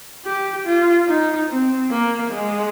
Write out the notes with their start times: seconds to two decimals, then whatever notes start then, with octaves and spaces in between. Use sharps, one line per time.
0.25 G4
0.65 F4
1.08 D#4
1.49 C4
1.90 A#3
2.31 G#3